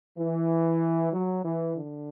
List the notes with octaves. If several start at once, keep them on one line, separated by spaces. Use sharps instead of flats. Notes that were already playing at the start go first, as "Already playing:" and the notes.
E3
F#3
E3
D3